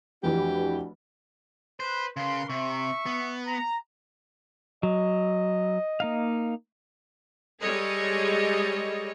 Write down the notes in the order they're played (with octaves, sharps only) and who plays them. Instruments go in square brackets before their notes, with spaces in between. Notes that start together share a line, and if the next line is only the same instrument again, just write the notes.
[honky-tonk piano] F1 E3 [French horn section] D4 F#4 [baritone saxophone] G4
[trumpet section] B4 [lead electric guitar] C5
[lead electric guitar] C#3 [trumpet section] A#4 B4 C6
[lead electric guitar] C3 [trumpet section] E5 C#6
[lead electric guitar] B3
[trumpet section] A#5
[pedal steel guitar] F#3 [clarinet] D#5
[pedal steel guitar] A#3 D#4 F5
[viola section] G3 G#3 G#4 A4 C#5 D#5